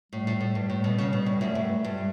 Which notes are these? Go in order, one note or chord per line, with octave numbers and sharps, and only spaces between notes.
A2 G3
A2
A2
G2 G3
A2
B2
C#3
B2
G2
F#2 A3
G2 A3
G2 G3
G3